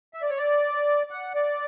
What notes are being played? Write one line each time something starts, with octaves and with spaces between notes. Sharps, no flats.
E5
D5
C#5
D5
F#5
D5